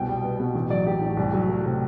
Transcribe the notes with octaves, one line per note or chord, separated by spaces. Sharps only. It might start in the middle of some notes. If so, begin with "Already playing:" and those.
Already playing: C2 B2 G5
G3
B3
B2
A1
F#3 D5
A1 G4
A2
C2
F#3
A3
C3